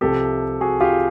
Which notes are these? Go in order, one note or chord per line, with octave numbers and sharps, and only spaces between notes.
C2 C3 F3 G4 A4
F#4 G#4
F4 G4